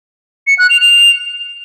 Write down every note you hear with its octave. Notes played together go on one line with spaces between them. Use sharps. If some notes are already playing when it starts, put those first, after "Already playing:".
C#7
F#6
F7
F7